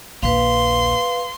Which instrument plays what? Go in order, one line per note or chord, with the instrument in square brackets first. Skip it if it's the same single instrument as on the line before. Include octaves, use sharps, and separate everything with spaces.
[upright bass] A#1 D#2 [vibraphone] B4 F5 [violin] C6